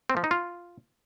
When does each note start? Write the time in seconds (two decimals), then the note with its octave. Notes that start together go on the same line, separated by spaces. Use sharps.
0.10 C4
0.17 F3
0.24 D#4
0.31 F4